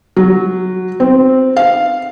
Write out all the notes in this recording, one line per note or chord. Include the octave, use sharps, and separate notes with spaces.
F#3
C4
F5